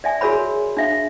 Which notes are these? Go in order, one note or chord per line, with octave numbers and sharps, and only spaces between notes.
D5 E5 G#5
F#4 G#4 A#4 C#5 B5
D4 E5 F5